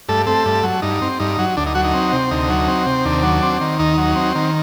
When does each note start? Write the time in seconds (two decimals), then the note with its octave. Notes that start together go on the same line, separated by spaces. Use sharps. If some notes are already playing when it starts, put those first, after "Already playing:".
0.09 G2 A3 A4
0.26 A3 C4 A4
0.45 G2
0.63 F#3
0.82 G2 D#4
1.02 C4
1.20 G2 D#4
1.39 F#3
1.57 D2 D4
1.66 D#4
1.75 F#3 F#4
1.84 D#4
1.94 C4
2.12 C3
2.31 D2 D#4
2.49 F#3
2.68 C4
2.87 C3
3.05 D#2 D4
3.23 F#3
3.43 C4
3.61 D#3
3.79 D#2 D#4
3.98 F#3
4.16 C4
4.35 D#3